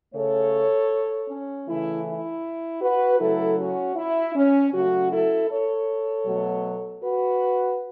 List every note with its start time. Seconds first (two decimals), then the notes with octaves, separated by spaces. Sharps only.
0.14 C#3 A3 A4 C#5
1.28 C#4
1.67 C#3 E3 A3 E4
2.05 E4
2.81 F#4 B4
3.19 C#3 F#3 A3 E4 A4
3.58 C#4 F#4
3.96 E4
4.35 C#4
4.72 C#3 F#3 A3 C#4 F#4
5.11 E4 A4
5.50 A4 C#5
6.26 B2 F#3 A3
7.03 F#4 B4